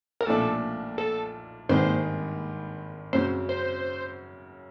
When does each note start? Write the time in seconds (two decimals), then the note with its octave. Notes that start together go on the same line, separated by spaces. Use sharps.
0.21 A#4
0.26 B1 A#2 F3 A3 D4 A4
0.98 A4
1.69 G#1 G2 D#3 G#3 B3 C5
3.13 F#2 C#3 F#3 C5
3.49 C5